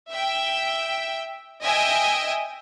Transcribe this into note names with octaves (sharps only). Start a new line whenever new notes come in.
E5 G5
D#5 E5 G5 G#5 D#6